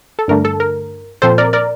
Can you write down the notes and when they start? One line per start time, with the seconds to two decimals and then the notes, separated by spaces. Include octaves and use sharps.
0.19 A4
0.28 G2 D3 A3 D4 A#4
0.45 A4
0.60 A#4
1.22 A#2 F3 C4 A4 C5
1.38 A#4 D5
1.53 A#4 D5